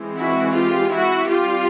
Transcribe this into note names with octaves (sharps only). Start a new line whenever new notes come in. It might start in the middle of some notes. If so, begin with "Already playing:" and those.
Already playing: E3 G#3 C4
E4 F#4
F4 G4
E4 F#4
G3 C4 F4 G4